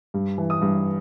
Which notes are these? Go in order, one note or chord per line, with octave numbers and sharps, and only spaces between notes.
G2
E3
D#6
G2